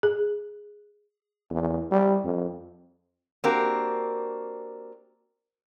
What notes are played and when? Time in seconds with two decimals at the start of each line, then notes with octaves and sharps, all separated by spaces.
0.03 G#4
1.50 E2
1.91 G3
2.24 F2
3.44 A#3 C4 D4 F#4 G4 A#4